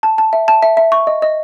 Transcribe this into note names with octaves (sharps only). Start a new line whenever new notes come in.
A5
A5
E5
A5
E5
E5
C#6
D#5
D#5